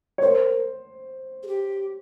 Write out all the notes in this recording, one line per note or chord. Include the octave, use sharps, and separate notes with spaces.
C#5
A#4 C5
G#4
G4